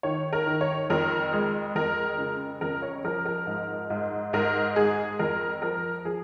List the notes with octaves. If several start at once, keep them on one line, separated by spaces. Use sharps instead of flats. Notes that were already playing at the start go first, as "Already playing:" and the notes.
D#3 C#5
A#4
D#3
C#5
F2 A#4
G#3
F2 A#4
C#3
F2 A#4
C#5
F3 A#4
A#4
G#2
G#2
G#2 A#4
G#3 G#4
F2 A#4
F3 A#4
F3 G#4